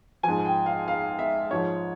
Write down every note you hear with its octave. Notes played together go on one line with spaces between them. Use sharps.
G#2 F3 G#5
G5
F5
F5
E5
G#2 F3 C#5